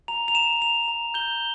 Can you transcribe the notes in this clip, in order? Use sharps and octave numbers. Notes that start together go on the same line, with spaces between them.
A#5 F7
F7
A#5 E7
A#5 F7
A#5
G6 G7